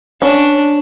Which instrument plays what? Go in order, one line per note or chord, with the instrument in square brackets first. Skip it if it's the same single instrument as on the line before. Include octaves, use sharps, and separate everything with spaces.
[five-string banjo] C#4 [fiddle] D4